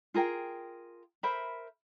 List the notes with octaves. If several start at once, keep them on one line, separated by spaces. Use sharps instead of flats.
F4 G#4 A#4 G5
A#4 C5 E5 B5